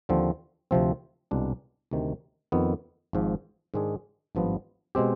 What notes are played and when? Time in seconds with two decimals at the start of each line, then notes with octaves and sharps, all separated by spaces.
0.09 D#2 D3 F3 C4
0.71 D2 C3 F3 C4
1.31 C2 B2 G#3 D4
1.91 D2 C3 D#3
2.52 F2 D#3 B3
3.13 G#1 G#2 F3
3.74 G#2 D#3 G#3 D4 G#4
4.35 G#1 G2 F3 B3
4.95 B2 G#3 C4 G4